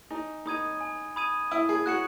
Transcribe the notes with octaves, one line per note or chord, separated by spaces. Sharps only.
D#4 G#5
D#4 B5 D#6 G#6 D#7
G#5
B5 D#6 G#6 D#7
E4 D#6
G#4
F#4 F#6 C#7 F#7